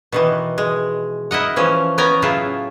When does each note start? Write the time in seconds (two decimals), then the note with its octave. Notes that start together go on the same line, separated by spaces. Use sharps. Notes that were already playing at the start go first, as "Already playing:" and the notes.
0.12 B2 D#3 E3
0.58 G#3
1.31 E4 A#4 D#5 F#5
1.56 E3 F3 C#4
1.98 B3 C#4 G5 G#5 A#5
2.22 A2 C#3 F#3 E4 F4